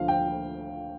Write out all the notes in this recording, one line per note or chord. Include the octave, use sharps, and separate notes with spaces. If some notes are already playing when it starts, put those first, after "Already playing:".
Already playing: D2 D3 F3 F5
G5